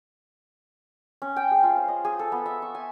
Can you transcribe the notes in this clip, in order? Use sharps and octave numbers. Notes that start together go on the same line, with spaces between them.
C#4
G5
G#4
F4
C5
D#5
G#4
A4
B3
E5
C#6
G#5